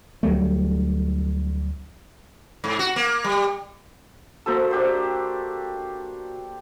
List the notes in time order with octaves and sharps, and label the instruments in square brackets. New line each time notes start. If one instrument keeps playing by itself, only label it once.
[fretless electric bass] D2 F#3 G3 A3
[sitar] G#2
F#4
A#3
G3
[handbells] A#3 F#4 A5 [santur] A4 C5 A#5
[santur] D4 G4 C5